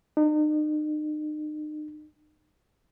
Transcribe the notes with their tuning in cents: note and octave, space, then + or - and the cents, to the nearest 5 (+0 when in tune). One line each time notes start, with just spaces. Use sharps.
D#4 -40